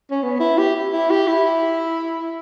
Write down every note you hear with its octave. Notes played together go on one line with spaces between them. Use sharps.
C#4
B3
E4
G4
E4
G4
E4